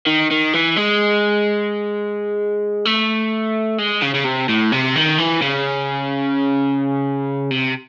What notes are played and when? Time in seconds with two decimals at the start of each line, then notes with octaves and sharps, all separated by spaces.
0.07 D#3
0.31 D#3
0.53 E3
0.76 G#3
2.85 A3
3.79 G#3
4.03 C#3
4.15 C#3
4.25 C3
4.49 A2
4.72 C3
4.96 D#3
5.18 E3
5.42 C#3
7.51 C3